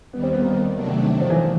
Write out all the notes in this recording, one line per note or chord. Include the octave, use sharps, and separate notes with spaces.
D#2 D#3 G3 B3
C4
B3
A#3
C3 D#3 F#3 A3 D4
F3
E3
F3